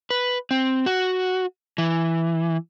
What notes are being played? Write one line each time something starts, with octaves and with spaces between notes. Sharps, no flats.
B4
C4
F#4
E3